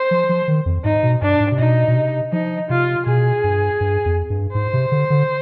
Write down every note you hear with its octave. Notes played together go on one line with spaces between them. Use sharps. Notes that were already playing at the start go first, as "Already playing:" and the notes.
Already playing: C5
F3
F3
D#3
F2
G#2 D#4
B2
G2 D4
G#2
C3
B2 D#4
B2
C3
F3 D#4
C3 F4
B2 G#4
G2
G2
F2
G2
G#2 C5
C3
D3
D3